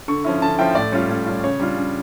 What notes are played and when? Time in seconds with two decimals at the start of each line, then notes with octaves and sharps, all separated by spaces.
0.08 D3 C#6
0.25 F3 C#4 E4
0.42 D3 A5
0.59 F3 C#4 E4 G5
0.75 A2 D5
0.92 G3 C#4 F4 C#5
1.09 A2
1.26 G3 C#4 F4
1.44 C#3 C#5
1.60 G3 D4 F4
1.77 C#3